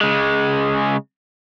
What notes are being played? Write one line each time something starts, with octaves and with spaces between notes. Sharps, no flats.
C#3 G#3